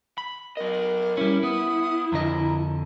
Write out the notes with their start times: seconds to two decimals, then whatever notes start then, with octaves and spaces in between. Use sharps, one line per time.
0.18 B5
0.57 F#3 A#4 D#5
1.17 G3 C#4 E4
1.43 B3 D#6
2.12 F2 D3 D#5 A#5